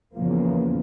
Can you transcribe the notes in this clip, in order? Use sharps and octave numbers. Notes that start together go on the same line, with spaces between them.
E2 C#3 F3 A#3